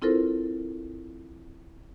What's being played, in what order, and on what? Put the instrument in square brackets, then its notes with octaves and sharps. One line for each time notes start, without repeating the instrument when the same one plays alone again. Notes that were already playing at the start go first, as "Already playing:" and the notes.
[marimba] C4 E4 F4 A4 A#4 C5